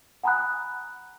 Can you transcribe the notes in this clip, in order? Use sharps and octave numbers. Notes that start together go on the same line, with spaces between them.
F#5 G#5 A#5 B5 D#6 F#6